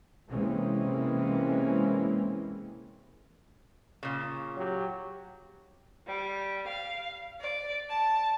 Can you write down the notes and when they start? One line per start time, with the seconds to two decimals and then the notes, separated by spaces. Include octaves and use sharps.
0.28 C3 E3 G#3 A#3 C4 C#4
4.03 A#2 C#3
4.57 F#3 G4
6.07 G3
6.68 F5
7.41 D5
7.90 A5